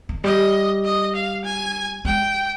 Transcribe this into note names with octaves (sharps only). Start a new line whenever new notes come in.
D#3
G3 D#5
D#5
F5
G#5
G#3 G5